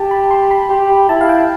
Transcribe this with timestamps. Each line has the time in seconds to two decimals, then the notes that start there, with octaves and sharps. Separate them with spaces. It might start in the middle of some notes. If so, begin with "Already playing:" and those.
Already playing: G4 A5
0.11 B5
0.31 C6
0.51 B5
0.70 G4
1.09 E4 A5
1.21 F5
1.29 G5